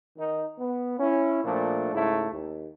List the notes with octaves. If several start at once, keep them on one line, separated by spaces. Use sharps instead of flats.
D#3 D#4
B3
C#4 E4
A#2 F3 A3 D4
G#2 C#3 A3 E4
D#2